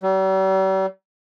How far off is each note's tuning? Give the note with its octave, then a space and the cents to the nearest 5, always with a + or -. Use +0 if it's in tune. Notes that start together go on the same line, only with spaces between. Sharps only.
G3 -45